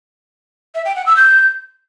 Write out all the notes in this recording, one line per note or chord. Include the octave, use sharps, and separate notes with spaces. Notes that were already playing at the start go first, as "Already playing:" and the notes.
E5
G5
F#5
E6
G6